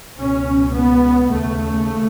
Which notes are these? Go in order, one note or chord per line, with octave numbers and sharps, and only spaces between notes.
C#2 B2 C#4
B3
D#2 C#3 A3